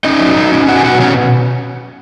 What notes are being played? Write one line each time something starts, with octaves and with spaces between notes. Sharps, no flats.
C#4 D#4 D#5
F#3
F#3
C#4
B2 F#4 F#5
G#5
F#3 F#4 F#5
B2 C#4 C#5